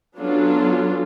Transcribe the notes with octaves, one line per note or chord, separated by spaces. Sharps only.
F#3 B3 C#4 D4 F4 A4